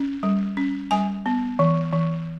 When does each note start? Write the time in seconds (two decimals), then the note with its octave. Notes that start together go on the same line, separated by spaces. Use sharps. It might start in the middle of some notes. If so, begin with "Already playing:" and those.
Already playing: C#4
0.23 G3
0.57 C#4
0.91 G3 G#5
1.26 B3
1.59 E3
1.93 E3